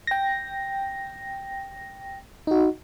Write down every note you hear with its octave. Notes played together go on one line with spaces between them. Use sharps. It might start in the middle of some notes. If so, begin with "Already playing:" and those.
G5 A#6
D#4 F#4